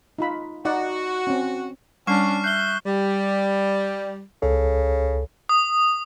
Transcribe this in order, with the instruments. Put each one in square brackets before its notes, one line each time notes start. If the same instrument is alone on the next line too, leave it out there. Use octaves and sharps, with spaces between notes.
[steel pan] D#4 F4 B5
[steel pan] D#4 D5 F#5 [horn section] F#4
[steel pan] C4 C#4
[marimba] G3 [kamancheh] C#4 D4 [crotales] C#6 F6 C7
[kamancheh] E5 [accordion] F#6 G6 [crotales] C7 G7
[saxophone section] G3
[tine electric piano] C#2 A4 [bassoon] C#3
[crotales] D#6